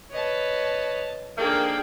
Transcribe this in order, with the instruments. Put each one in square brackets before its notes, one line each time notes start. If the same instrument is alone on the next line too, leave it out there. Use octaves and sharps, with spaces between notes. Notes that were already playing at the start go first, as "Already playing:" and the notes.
[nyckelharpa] B4 C#5 [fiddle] D#5 A5
[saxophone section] D#3 F3 A#3 [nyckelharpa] D4 G#4 [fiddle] A4 G5